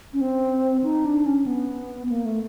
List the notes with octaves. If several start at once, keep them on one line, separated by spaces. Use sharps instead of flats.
C#4
C4
D#4
D4
C#4
B3
A#3
A3